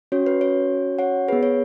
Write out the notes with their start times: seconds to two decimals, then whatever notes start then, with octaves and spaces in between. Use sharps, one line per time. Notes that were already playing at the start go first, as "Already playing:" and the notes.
0.12 C#4 F#4 C#5
0.26 B4
0.41 C#5
0.99 C#5 F#5
1.28 B3 G#4 B4
1.43 C#5